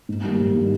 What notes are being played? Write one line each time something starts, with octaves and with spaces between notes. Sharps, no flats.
G#2
D#3 G3 A#3
G#2
D#3 G3 A#3